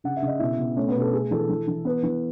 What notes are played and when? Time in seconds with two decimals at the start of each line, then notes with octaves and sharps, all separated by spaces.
0.04 C#3 F#5
0.17 E5
0.22 C#3
0.27 D#5
0.39 B2 E4 E5
0.58 B2
0.76 A3 C#4 C#5
0.88 B3 B4
0.95 B2
1.00 A4
1.13 A3 G#4
1.31 E3 A4
1.49 E3
1.67 E3
1.85 B3 B4
2.03 E3